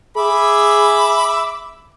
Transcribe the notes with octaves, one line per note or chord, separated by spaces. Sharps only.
G#4 E5 B5 D6